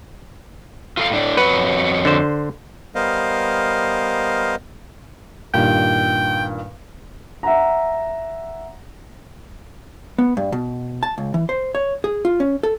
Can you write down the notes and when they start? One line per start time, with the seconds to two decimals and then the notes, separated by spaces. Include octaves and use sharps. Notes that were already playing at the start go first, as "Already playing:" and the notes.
0.97 F4 A4 F5
1.10 A2 D4
1.37 F2 F#4 B4 C#5
2.05 D3 C5
2.95 G3 B3 A#4 C5 D#5 F5
5.54 G2 A#2 D#3 G5
7.43 E5 F#5 A#5
10.19 B3
10.37 G2
10.52 B2
11.03 A5
11.18 C#2
11.34 E3
11.49 C5
11.75 C#5
12.04 G#4
12.25 F4
12.40 C#4
12.63 A4